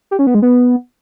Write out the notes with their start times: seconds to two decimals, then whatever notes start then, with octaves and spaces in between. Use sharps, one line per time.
0.11 G4
0.19 C#4
0.27 B3
0.34 G#3
0.42 B3